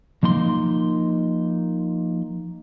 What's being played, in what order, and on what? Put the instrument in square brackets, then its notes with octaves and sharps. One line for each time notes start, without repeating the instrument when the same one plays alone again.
[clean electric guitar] F3 A#3 D#4 C6